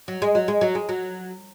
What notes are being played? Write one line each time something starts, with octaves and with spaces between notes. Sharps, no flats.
F#3
G#3
F#3
G#3
F#3
G#3
F#3